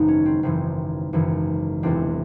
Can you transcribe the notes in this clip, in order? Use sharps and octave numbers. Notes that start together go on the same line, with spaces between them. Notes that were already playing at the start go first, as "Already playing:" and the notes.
Already playing: G#1 F#2 C#3 E3 D#4
C#4
C4
G#1 F#2 C#3 E3 C4
G#1 F#2 C#3 E3
E1 E2 C3 C4 D4